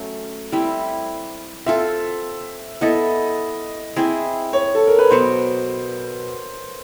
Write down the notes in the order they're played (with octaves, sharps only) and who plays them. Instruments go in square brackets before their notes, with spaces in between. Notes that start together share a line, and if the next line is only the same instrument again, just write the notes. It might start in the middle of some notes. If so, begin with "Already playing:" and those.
Already playing: [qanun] F#3 A3 C#4
G3 C4 E4
[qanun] C4 F4 A4 [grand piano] E5
[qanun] B3 E4 A4 [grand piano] D#5
[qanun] C4 E4 G#4
[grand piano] C#5
A4
A#4
B4
[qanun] B2 F#3 B3 [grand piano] C5